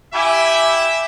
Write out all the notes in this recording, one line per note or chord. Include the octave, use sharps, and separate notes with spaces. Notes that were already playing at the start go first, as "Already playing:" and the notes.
E4 G4 E5 G#5